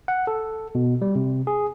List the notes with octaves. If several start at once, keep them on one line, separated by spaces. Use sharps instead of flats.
F#5
A4
B2
G3
C3
G#4